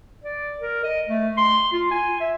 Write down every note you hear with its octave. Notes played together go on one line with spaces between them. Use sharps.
D5
A#4
D#5
A3
C6
F4
G#5
E5